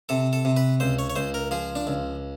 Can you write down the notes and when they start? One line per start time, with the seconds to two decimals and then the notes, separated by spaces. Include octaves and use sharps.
0.09 C3 A4
0.33 A4
0.45 C3
0.57 B4
0.80 C#2 C5
0.99 C#5
1.10 C#5
1.16 C#2 C5
1.34 A#4
1.51 F3 G#4
1.76 D4
1.87 C#2